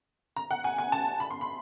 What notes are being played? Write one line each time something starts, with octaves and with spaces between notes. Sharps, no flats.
A#5
F#5
G#5
G#5
A5
B5
C6
B5